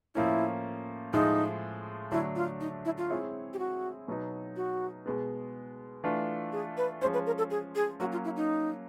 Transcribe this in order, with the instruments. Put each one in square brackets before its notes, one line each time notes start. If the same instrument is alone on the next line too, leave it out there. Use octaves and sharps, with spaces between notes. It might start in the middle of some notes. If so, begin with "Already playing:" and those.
[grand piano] A2 F3 A#3 C#4 [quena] E4
[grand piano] A2 F3 G#3 [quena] D#4
[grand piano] D3 F#3 A3 D4 [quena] E4
[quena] F4
D#4
E4
F4
[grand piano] G#3 C4 E4 G#4 C#5
[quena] G4
F#4
[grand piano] B2 F#3 B3 D#4
[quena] F#4
[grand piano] B2 G#3 B3
E3 A3 D4 F4
[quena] G#4
B4
[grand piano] F3 G#3 C#4 [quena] C5
[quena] B4
A#4
A4
G#4
G#4
[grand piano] F#3 A#3 C#4 [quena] F#4
[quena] F4
E4
D#4